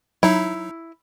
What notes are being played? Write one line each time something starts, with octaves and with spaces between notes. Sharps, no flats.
F#3 D#4 E4